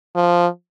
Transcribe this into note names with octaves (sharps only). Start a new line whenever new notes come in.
F3